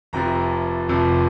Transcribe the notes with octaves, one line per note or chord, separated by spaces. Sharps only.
F1 F2 C3 F3 A#5
F1 F2 C3 F3